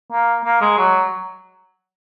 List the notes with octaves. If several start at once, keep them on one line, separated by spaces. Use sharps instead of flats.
A#3
A#3
G#3
F#3